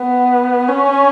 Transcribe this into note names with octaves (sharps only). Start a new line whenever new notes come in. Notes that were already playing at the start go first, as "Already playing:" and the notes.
Already playing: B3
C#4